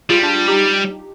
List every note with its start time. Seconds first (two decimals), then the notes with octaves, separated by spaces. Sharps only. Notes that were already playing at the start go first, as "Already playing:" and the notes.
0.10 G3 F4 G#4
0.23 D4 F4
0.48 D#4 G4